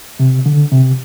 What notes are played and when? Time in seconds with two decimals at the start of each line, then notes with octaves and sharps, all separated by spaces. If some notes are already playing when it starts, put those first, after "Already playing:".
0.20 C3
0.46 D3
0.72 C3